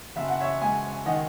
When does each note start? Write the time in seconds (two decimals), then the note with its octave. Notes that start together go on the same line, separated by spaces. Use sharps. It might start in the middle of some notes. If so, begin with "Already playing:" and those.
0.16 F#1 E5
0.28 F#5
0.40 C#5 E5
0.61 G#3 E5 G#5
1.06 D#3 D#5 F#5